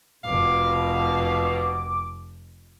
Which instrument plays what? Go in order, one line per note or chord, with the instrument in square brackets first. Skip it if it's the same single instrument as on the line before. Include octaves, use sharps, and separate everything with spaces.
[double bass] F1 F2 [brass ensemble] B2 [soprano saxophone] F5 [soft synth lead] D6